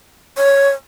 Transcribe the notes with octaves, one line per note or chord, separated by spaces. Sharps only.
C#5